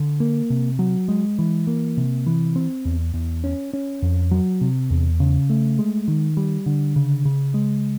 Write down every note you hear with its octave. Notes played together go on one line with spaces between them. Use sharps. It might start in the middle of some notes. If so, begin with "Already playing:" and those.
Already playing: D3
A#3
C3
F#3
G#3
E3
A#3
C3
E3
C4
E2
E2
C#4
C#4
F2
F#3
C3
E2
C#3
A3
G#3
D#3
G3
D3
C#3
C#3
G#3